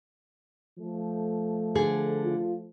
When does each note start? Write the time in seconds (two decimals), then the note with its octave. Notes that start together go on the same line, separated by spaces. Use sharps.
0.78 F3 A3
1.75 D3 G#4
2.25 F4